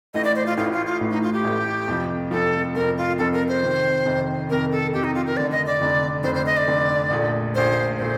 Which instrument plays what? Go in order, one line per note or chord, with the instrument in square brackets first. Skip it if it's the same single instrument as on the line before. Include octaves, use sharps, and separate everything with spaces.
[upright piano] A1 A2 A3 [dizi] D#5
[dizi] D5
C5
F4
[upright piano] A1 A2 A3 [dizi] F4
[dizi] F4
F4
[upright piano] A1 A2 A3
[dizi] D#4
F4
G4
[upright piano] A1 A2 A3
F2 C3 F3
[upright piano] F2 C3 F3 [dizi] A4
[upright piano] F2 C3 F3 [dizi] A#4
[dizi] F4
[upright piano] F2 C3 F3 [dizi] A4
[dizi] A#4
C5
[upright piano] F2 C3 D#3
F2 C3 D#3
[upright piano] F2 C3 D#3 [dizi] A#4
[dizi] A4
[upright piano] F2 C3 D#3 [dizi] G4
[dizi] D#4
F4
A#4
[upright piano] F1 F2 D3 [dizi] D5
[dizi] D#5
D5
[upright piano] F1 F2 D3
[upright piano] F1 F2 D3 [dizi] C5
[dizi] C5
D#5
D5
[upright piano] F1 F2 D3
A#1 A#2 A3
[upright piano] A#1 A#2 A3 [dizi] C5
[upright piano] A#2 A3 [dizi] C5